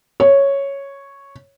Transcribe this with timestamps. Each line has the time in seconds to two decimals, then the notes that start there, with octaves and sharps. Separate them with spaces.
0.20 C#5